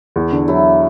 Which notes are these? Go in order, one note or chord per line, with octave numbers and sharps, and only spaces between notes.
E2
D3
F#3 E4